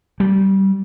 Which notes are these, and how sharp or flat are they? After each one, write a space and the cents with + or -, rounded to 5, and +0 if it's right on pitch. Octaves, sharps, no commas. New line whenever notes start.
G3 -20